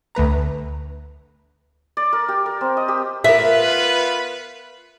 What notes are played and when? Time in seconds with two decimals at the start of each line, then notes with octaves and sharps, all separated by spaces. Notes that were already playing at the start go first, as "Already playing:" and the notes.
0.15 D2 A3 B4 A#5
1.97 D5
2.13 A#4
2.28 G4
2.46 A#4
2.61 C4
2.77 D#5
2.88 G4
3.24 B3 F4 A#4 B4 E5